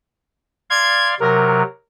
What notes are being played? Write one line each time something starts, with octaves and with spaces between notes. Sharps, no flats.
D5 F5 C6 G#6
C3 F#3 A#4